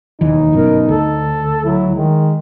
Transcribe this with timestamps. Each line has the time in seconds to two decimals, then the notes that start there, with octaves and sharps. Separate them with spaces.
0.21 E1 D#2 E3 D#4
0.53 G1 F#2 B2 A#4
0.88 D2 A4
1.65 F#3 E4
1.95 D#3 G#3